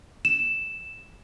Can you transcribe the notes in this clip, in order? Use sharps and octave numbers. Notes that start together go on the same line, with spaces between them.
E7